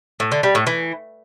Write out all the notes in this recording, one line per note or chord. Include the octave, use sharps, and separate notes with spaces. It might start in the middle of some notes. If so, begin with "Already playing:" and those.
A2
D3
G3
A2
E3